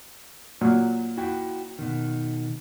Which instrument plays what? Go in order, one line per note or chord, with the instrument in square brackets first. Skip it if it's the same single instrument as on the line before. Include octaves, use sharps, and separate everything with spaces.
[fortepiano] A#2 F#3
[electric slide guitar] E4 F#4 G5
B2 D#3